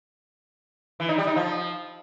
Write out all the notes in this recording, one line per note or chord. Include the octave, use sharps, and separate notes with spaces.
E3
D#4
G3
D#4
F3